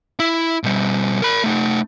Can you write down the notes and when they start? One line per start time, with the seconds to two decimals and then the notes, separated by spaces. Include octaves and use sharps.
0.20 E4
0.64 B2 G3
1.22 A#4 B5
1.44 A3 D#4